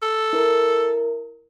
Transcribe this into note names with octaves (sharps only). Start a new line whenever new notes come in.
A4
E4 A#4